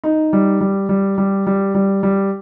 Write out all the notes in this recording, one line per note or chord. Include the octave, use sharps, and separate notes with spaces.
D#4
G3
G3
G3
G3
G3
G3
G3